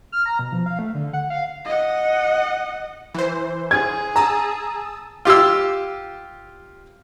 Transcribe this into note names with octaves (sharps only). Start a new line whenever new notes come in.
F6
A#5
B2
F3
F5
A3
D3
F#5
F5
D#5 F#5
E3 C5
G#4 G#6
A5 A#5 D#6 E6
F4 G4 F5 E6